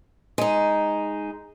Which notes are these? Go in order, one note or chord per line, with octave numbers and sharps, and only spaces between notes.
G#3 D#4